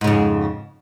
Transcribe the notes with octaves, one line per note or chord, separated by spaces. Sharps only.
F2 G#2 C#3